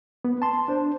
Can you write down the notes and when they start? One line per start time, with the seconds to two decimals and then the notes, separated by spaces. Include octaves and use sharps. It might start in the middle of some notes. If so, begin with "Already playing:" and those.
0.24 B3
0.42 A5 C6
0.68 D4 C5